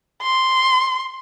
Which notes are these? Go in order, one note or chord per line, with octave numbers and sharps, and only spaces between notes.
C6